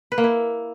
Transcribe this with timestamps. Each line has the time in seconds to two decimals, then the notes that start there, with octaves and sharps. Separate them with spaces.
0.12 B4
0.18 A#3
0.24 E4